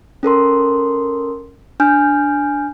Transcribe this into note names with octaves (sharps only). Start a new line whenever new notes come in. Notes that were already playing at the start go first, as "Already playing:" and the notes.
C#4 A4 A#4 C6
D4 G#5 F6 G6